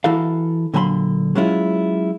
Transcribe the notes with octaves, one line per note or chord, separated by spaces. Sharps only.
E3 E4 F#4 A4 F5
A#2 D3 F#3 G#5 B5 C6
F#3 G#3 C#4 E4 F4